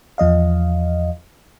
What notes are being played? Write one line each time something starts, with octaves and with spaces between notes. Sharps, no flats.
E2 F3 D#5 F5